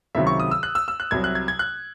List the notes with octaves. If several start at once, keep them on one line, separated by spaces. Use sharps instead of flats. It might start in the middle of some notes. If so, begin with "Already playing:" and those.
C#2 C3 D#3 F#3 E5
C#6
D#6
E6
F#6
E6
E6
F#6
C2 C3 F#3 G#6
F#6
G#6
G#6
F#6